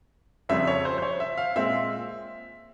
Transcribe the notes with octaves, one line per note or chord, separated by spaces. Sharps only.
F2 C#3 G3 C4 E5
C#5
C5
C5
C#5
E5
F5
A#2 G#3 C4 E5